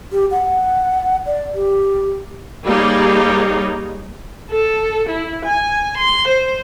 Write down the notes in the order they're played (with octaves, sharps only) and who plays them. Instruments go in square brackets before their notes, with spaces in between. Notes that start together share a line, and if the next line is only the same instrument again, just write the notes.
[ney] G4
F#5
D5
G4
[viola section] G3 A#3 D#4 G4 G#4 C#5
[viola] A4
E4
G#5
C6
C5